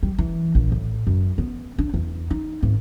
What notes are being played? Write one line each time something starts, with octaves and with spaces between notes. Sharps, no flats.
G3
E3
A#1
A2
F#2
B3
D4
E2
D#4
G#1